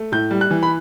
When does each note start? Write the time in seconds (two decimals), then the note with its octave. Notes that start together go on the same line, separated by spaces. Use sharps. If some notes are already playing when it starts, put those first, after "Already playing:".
Already playing: A3
0.12 A2 G6
0.31 G3
0.41 F#6
0.51 E3
0.63 B5